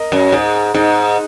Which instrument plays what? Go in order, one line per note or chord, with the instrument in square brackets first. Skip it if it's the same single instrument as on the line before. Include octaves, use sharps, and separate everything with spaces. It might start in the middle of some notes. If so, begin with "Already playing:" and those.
Already playing: [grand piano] A#4 D#5
[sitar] F#2
[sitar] G#2 [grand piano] G#4
[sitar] G#2 [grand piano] D#4